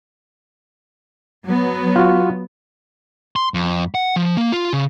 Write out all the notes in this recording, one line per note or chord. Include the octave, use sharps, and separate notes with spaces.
F#3 B3
F4 F#4
C6
F2
F#5
F3
A#3
F4
C#3